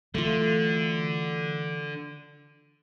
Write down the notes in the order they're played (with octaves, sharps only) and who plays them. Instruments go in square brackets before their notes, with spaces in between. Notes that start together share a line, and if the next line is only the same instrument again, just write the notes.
[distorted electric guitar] D3 [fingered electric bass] E3 F#3 [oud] A3 F4